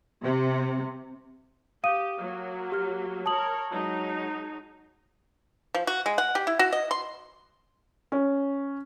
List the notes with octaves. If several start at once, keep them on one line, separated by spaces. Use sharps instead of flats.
C3
G4 F5 D#6 D#7
F#3 A#3
G4 F6
A#4 C#5 A5 D#6 F#7
F#3 G#3 D#4
F3
F#4
G#3
F#5
G4
E4
F#4
D#5
C6
C#4